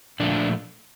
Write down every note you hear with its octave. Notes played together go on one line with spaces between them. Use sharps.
A#2 F3 A3 D4